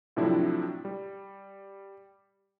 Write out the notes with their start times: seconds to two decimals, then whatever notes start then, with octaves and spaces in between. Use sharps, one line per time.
0.17 A2 C3 F3 F#3 D4 E4
0.85 G3